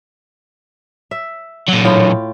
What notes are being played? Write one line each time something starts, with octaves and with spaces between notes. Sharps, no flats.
E5
A#2 F#3
A2 F4 G5